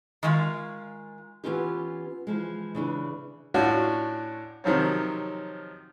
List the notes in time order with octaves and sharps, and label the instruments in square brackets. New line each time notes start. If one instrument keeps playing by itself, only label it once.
[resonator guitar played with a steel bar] D#3 G#3 F4
[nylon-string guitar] E3 F#3 B3 C#4 F4 G4
E3 F3 G#3
C#3 E3 D4
[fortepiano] A2 C#4 D4 F4 F#4
C3 D#3 F3 F#3 C#4